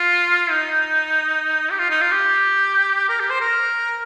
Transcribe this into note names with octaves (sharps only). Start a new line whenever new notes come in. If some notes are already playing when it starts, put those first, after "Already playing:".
Already playing: F4
D#4
G4
F4
D#4
F4
G4
A#4
G4
C5
A#4